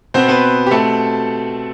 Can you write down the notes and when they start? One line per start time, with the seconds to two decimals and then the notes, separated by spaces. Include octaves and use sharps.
0.14 B2 B3 C4 C5
0.28 B3 B4
0.67 G4
0.71 B2 A3 C4 A4